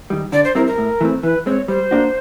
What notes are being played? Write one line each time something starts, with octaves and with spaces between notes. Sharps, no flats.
D#3 G3
D3 D5
C5
G3 C4 E4 A#4
A#4
A2
E3 A3 C4
E3 B4
G#3 C4 C#5
G3 C5
A#3 D4 F#4